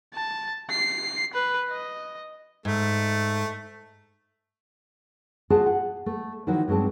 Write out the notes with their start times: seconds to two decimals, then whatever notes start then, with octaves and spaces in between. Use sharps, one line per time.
0.14 A5
0.70 C7
1.34 B4
1.70 D#5
2.65 G#2 A3
5.50 F4 F#4 G#4 D5 G#5 A5
5.66 F#5
6.06 A3
6.47 D#3 F3 F#3 E4 F#4
6.68 G2 F#3 G#3 C4 A5